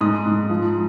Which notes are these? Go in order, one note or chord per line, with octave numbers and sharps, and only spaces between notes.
G#2 D#6
G#2
F3